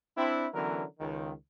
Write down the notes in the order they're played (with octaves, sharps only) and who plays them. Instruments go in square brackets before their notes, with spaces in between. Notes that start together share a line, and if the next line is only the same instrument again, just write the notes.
[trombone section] C4 D4 E4
D3 E3 F#3 B3 C#4 A#4
C#2 D#3